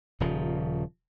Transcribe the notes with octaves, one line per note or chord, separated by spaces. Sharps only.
D#1 C#3 F3